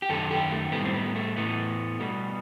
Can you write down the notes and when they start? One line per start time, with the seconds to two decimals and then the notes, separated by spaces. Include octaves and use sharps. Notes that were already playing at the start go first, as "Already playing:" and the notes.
0.02 G4
0.09 F#2 D#3 A4
0.31 G4
0.51 A3
0.72 A2 G3 B3
0.85 C4
0.94 B3
1.15 A3
1.36 A2 E3 A3 B3
2.00 B2 G3